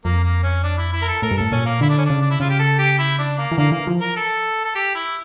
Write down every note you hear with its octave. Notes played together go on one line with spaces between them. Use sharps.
F2 A#3
A#3
C#4
D4
E4
E4
A#4
A4
A2 A#4
G2
A2 A4
A#2 C#4
A#3
D3 E4
D4
C#4
C#3 D4
D4
E4
C#3 F4
G4
A4
G4
E4
D4
A#3
E3
D3 A#3
E3 A#3
F3
A#4
A4
A4
G4
E4